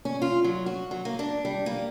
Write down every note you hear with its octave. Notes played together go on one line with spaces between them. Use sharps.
C#4
F4
F#3
F#4
F#3
A#3
D4
G3
A#3